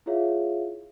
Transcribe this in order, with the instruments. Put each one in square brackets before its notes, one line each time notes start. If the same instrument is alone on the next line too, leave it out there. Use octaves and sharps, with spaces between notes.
[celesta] E4 F4 G#4 C#5 E5 F5